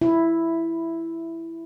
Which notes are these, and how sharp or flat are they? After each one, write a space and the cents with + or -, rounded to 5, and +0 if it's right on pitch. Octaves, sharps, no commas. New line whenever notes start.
E4 +5